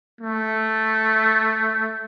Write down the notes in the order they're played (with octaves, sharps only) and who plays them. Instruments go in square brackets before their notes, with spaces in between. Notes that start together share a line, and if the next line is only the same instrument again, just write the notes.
[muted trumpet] A3